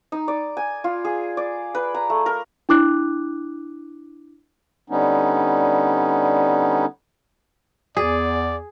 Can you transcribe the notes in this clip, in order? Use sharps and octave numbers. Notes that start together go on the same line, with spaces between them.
D#4
D5
G#5
F4
G#4
D5
B4
A#5
A3
A#4
D4 E4 D6 F#6
D3 G3 B3 C#4 D#4
E2 G#4 D5